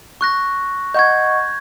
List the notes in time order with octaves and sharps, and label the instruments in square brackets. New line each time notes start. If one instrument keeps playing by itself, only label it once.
[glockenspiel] C#6 F#6 A#6
[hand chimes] D#5 F#5 C#6 [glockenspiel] G6 G#6